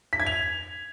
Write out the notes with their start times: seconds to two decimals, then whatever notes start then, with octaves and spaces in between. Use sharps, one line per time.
0.13 B6
0.20 G#6
0.26 F7